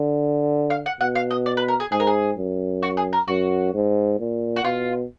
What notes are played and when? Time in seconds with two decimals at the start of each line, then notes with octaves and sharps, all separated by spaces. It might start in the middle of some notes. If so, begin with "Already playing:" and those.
Already playing: D3
0.70 F5
0.86 F#5
1.00 B2 F#5
1.15 F5
1.31 D#5
1.46 D5
1.57 B4
1.68 A#4
1.80 G#4
1.91 G#2 G#4
2.00 A#4
2.07 G#4
2.37 F#2
2.83 F#4
2.97 G#4
3.13 A#4
3.28 F#2 F#4
3.74 G#2
4.19 A#2
4.56 F#4
4.64 B2 F4